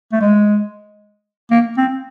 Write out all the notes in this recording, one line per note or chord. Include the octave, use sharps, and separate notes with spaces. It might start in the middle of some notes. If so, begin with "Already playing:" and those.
A3
G#3
A#3
C4